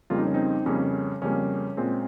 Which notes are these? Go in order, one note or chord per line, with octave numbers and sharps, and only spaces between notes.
F2 C#3 G3 A#3 F4
D#4
C#4
C4 D#4
F2 C#3 G3 A#3 C#4
F2 C#3 G3 A#3 C#4
A#2 G#3 C4